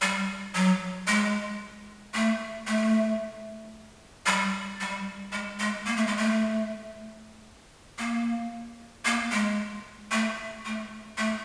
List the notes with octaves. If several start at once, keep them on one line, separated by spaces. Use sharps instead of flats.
G3
F#3
G#3
A3
A3
G3
G3
G#3
G#3
A#3
A3
G#3
A3
A#3
A#3
G#3
A3
A3
A3